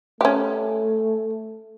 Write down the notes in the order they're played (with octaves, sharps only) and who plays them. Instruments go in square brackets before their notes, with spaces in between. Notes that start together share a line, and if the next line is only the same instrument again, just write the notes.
[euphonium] A3 [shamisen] C#4 G4